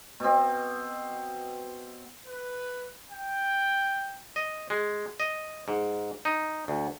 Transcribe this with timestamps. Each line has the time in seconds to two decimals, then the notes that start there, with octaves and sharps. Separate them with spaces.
0.20 B2 C4
2.27 B4
3.10 G5
4.36 D#5
4.70 G#3
5.20 D#5
5.68 G#2
6.25 D#4
6.68 D2